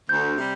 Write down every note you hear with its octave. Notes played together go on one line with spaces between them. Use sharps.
D2 G6
C3 G3